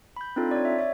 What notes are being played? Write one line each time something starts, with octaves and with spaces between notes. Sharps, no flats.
B5 G6
C4 D4 D#4 F4 A4
C#5 D5
E5
C#5 E5